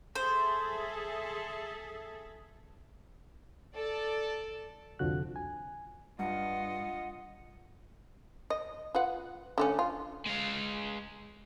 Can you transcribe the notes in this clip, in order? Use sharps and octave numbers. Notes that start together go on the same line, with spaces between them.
G#4 A4 C5 E5
A4 D5
C2 F2 D3 F3 F#4 F#6
G#5
G2 F4 D#5 F#5
D#5
F4 B4 F#5
D3 A3 C#4
F4
G#3 F5